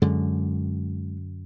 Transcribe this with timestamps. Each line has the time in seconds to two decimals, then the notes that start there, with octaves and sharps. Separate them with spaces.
0.02 F#2 D3 G#3